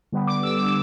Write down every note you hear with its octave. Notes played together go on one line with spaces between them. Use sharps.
D3 G3 B3
D6
E6
D6